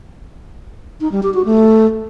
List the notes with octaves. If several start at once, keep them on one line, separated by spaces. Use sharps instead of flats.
D#4
G3
G4
F#4
A3